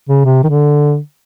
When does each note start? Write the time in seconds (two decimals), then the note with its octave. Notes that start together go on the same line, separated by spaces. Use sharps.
0.09 C#3
0.25 C3
0.44 D#3
0.49 D3